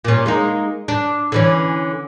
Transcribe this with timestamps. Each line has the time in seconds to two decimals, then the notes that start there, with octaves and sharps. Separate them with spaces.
0.05 A#2 C#4
0.26 G#3 A#3 D#4
0.88 D4
1.32 D3 E3 C#4